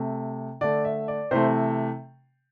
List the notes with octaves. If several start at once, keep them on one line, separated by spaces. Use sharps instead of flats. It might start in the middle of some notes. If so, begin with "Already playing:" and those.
Already playing: C3 A3
D3 A3 D5
E5
D5
C3 E3 A3 C5